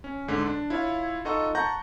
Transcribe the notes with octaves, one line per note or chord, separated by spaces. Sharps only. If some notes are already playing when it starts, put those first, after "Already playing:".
C#4
G#2 D3
D4
E4 F4 C#5 F5
D#4 F4 A4 D#5 F#5 C#6
F#5 A5 A#5 C#6 G6 A#6